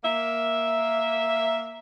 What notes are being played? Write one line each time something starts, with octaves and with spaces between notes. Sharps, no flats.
A#3 E5